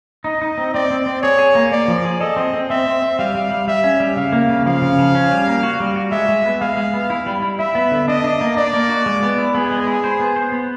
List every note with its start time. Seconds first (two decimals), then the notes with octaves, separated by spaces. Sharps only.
0.24 D#4 D#5
0.42 D#4
0.58 C4
0.74 C4 D5
0.90 C4
1.06 C4
1.23 G#4 C#5
1.39 G#4
1.55 A#3
1.72 A#3 D5
1.88 F3
2.05 G#4
2.21 A4 D#5
2.36 C4
2.53 C4
2.70 C4 E5
2.86 C4
3.02 C4
3.19 G3 F5
3.35 G3
3.51 G3
3.67 G3 E5
3.84 C#4
4.00 G3
4.16 C#3 F5
4.33 A#3
4.49 C#3
4.65 F3 F5
4.82 C#3
4.99 F3
5.15 C#4
5.31 G3
5.47 A#3
5.63 F#4
5.80 G3
5.96 F#4
6.12 G#3 E5
6.29 G#3
6.45 B3
6.61 G#3 F5
6.77 G#3
6.93 B3
7.10 E4
7.26 G3
7.42 E4
7.59 E4 E5
7.75 B3
7.91 D3
8.08 D4 D#5
8.24 D4
8.41 A#3
8.57 D4 D5
8.73 A#3
8.89 F#4
9.06 G#3
9.23 B3
9.38 E4
9.55 B3 G#4
9.71 G#3
9.87 E4
10.04 C5
10.20 B3
10.36 C5
10.52 B3